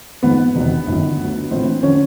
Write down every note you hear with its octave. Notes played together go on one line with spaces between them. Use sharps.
A1 G#2 F3 B3
E1 E2 C3 D#3 F#3
G1 F#2 D#3 F#3
D2 D3 F#3
A#1 A2 E3 C4
D3 F3 C#4